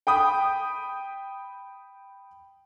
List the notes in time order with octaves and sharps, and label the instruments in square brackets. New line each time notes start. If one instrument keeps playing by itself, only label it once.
[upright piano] G5 B5 D#6